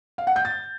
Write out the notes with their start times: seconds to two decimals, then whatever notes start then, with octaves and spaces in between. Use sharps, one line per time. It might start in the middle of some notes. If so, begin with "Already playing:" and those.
0.18 F5
0.27 F#5
0.36 G6
0.45 A6